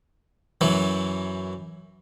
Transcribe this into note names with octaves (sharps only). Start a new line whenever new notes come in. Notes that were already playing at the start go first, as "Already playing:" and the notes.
F#2 E3 F#3